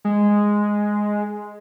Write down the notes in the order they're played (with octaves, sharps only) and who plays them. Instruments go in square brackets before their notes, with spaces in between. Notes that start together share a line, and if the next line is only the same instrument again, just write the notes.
[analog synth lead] G#3